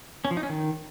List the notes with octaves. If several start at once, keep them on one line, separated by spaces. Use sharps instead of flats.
C#4
F3
D#4
C#4
D#3